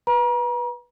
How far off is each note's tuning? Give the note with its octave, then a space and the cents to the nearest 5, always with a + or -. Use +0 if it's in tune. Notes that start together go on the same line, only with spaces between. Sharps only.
B4 -10 A#5 +40